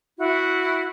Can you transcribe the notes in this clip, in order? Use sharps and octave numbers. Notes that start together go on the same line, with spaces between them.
E4 F#4